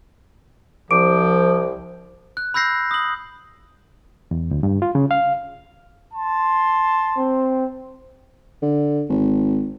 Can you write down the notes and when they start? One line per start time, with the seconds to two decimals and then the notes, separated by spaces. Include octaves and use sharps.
0.91 C2 F3 D6 D7
2.37 F#6
2.54 B5 E6 G6 A#6 C7
2.91 D#6 F#7
4.31 E2
4.51 D2
4.63 G2
4.82 F4
4.95 C#3
5.11 F5
6.14 A5 C6
7.18 C4
8.62 D3
9.10 G#1